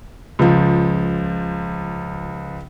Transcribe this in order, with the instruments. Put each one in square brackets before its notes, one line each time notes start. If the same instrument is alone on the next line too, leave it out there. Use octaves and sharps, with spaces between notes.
[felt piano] C#2 F3